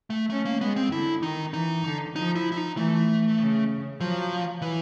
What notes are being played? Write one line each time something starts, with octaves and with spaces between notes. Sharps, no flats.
A3
A3 C#4
A#3
G#3 B3
C4
D3 E4
D#3 D#4
E3 D#4
D3
F3 D#4
E4
E4
D#4
E3 A3
C#3
F3 F#3
E3